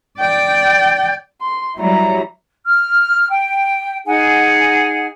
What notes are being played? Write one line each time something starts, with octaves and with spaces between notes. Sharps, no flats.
D5 G5
C6
F#3 G3 E4 A#5
F6
G5
D#4 G#4 F#5 G#5